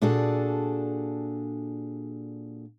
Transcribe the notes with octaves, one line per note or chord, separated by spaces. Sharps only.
A#2 D4 F#4 G#4 A4